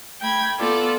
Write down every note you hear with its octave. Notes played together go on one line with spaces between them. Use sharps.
A3 G5 B5 G#6
B3 F4 A4 D5